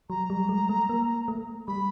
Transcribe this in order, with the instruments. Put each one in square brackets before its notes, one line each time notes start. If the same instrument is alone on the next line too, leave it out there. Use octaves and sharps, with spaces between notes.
[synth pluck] F#3 [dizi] A#5
[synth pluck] G3
G#3
A3
A#3
A3
[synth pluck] G3 [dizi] B5